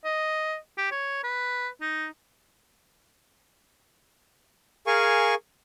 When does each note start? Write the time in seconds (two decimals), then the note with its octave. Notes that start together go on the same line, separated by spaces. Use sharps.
0.05 D#5
0.78 G4
0.91 C#5
1.24 B4
1.81 D#4
4.87 G#4 A#4 F5 G#5 C#6